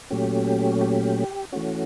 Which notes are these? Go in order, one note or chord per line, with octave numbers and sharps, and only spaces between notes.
A#2 F#3 A3 C#4 G4
G4
E3 A3 C#4 F#4